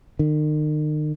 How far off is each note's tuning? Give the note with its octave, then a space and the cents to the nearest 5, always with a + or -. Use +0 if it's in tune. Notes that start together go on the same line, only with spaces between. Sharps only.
D#3 -40